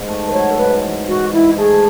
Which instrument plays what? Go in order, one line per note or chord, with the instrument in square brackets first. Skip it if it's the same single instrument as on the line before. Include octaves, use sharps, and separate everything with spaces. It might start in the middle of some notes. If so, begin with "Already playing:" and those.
Already playing: [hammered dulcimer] G#2
A3
[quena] B4
[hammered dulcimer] F#3 [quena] C#5
[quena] A4
[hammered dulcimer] G#2 [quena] B4
[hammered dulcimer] E3
[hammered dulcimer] G#2 [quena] F#4
[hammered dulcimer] G#2 [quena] E4
[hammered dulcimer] A3 [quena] G#4